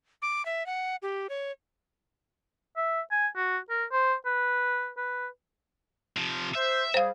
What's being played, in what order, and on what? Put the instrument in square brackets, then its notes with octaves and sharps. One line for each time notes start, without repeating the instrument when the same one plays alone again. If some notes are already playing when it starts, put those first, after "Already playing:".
[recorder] D6
E5
F#5
G4
C#5
[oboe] E5
G#5
F#4
A#4
C5
B4
B4
[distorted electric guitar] C3 F3
[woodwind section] C5 [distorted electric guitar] E5
[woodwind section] G3 G#4 [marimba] C5 F5